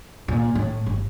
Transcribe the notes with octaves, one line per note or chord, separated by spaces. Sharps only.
A#2
A2
G1